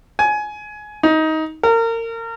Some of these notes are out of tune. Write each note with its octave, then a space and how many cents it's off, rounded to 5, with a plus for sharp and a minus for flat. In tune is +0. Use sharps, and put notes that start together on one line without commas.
G#5 +20
D#4 +20
A#4 -30